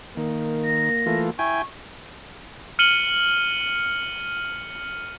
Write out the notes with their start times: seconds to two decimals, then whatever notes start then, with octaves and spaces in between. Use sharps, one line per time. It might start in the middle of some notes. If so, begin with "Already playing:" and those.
0.17 D#3 A#3
0.65 A#6
1.06 E3 A3 F4
1.39 E4 G5 G#5 C#6
2.79 F6 C#7 D#7 F#7 G7